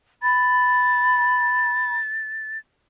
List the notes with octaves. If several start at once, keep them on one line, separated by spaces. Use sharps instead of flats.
B5 A6